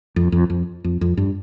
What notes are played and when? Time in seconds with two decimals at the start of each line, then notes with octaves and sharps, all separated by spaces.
0.16 F2
0.32 F2
0.50 F2
0.84 F2
1.01 F2
1.17 G2